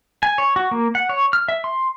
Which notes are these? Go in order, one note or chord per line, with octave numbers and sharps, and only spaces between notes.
G#5
C#5
F#4
A#3
F#5
C#5
F6
E5
C6